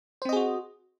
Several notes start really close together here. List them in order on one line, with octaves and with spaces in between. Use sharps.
C5 C4 D#5 G#4 F#4